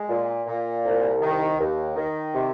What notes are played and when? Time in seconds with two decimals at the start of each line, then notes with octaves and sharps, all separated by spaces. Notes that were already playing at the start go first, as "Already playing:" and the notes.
Already playing: G#3
0.09 A#2
0.46 A#2
0.84 C2
1.21 D#3
1.59 D#2
1.96 D#3
2.33 C3